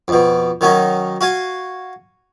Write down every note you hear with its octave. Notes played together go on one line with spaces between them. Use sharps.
F2 B2
D#3 F#3 C#4 D#4
F#4 F5 G#5